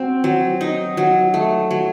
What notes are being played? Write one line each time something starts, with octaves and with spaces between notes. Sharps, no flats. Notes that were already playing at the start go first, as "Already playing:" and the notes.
Already playing: C4 F#4
F#3
D#4
F#3
A3
F#3